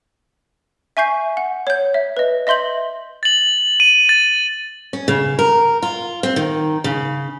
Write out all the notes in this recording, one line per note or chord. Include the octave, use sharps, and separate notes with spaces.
E5 G#5 C#6 G6 C7
F#5
C#5 G6
E5
B4 D#5
D#5 E5 C6 G6 F#7
A6 F#7
D#7
A6
C#4
C#3
A#4
F4
C4
D#3
C#3